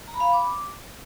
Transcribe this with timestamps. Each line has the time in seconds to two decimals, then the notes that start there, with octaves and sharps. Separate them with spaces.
0.07 A#5
0.14 B5
0.20 F5
0.27 B5
0.33 D6